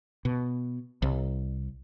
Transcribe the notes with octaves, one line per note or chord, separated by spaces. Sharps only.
B2
C2